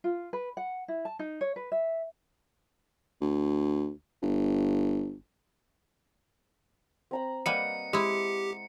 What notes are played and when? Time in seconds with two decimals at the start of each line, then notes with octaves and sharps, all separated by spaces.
0.04 F4
0.33 B4
0.57 F#5
0.88 E4
1.05 A5
1.19 D#4
1.41 C#5
1.56 B4
1.72 E5
3.21 D2
4.23 G1
7.11 C4 A#5 B5
7.46 G3 A#3 B4 D#5 F#5 D#6 C#7
7.93 G#3 E4 G4